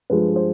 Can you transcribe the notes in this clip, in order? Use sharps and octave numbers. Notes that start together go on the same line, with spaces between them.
G2 F3 G#3 B4
C5